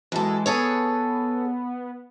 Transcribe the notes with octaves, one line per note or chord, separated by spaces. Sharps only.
F#2 E3 G#3 A4
B3 G#4 A4 C#5